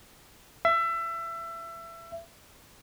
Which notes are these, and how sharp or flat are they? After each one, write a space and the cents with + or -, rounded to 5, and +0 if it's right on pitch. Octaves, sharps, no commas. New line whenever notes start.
E5 +25